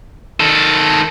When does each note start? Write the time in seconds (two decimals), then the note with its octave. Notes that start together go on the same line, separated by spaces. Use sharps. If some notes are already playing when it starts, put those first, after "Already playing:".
0.40 D#3 A4